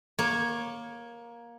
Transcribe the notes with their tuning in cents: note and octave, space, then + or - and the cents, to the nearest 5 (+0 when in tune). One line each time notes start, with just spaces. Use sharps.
A#3 +15 C#5 -10